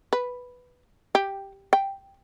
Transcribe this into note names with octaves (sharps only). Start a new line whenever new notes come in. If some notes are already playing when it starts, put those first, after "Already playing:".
B4
G4
G5